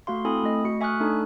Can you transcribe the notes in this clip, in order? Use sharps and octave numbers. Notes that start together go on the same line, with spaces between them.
A3 F#4 F5 C6
C4 E4 A4 G#5 B5 D#6
A3 D#5
A3 F#4 C#7
E5 G#5 C#6 D#6 F6 F#6
A3 D4 D#4 A4